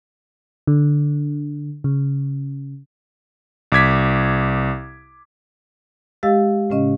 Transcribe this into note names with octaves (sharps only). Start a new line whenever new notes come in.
D3
C#3
C2 D6 G#6 B6
G#3 G4 D#5 F5 E6 A6
A2 C#3 C#4 D#5